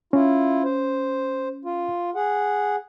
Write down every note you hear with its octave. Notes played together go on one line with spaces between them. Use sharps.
C#4 E4 F4
C5
F4
G#4 F#5